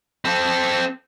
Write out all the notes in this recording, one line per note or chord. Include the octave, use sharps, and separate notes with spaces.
C4 A4